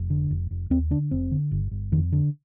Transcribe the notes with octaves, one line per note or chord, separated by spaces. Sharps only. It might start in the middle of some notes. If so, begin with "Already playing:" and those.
Already playing: F1
D3
F1
F1
D#2 C4
D3 D4
F1 C4
D3
G1
G1
F2 D#3
D3